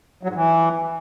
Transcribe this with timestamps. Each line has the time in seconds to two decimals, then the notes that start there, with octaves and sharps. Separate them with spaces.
0.23 F#3
0.29 G#2
0.35 E3